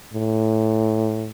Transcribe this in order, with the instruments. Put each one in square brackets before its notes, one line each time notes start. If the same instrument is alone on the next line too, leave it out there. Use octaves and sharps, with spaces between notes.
[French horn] A2